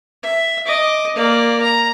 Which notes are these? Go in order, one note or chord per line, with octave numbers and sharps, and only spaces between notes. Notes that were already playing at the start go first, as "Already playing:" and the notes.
E5
D#5 D6
A#3 D5
A#5